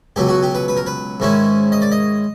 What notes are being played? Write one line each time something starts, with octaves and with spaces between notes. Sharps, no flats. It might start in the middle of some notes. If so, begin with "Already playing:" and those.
C#2 B2 F#3 G4
F#4
G4
B4
B4
A#4
B4
G#2 D#3 G#3 C#4 E4
D#5
D5
D#5